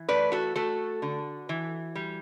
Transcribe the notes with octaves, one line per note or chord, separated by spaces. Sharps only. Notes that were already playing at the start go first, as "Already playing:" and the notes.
Already playing: E3
A3 B4 D5
F#4 A4
A3 F#4 A4
D3
E3
G3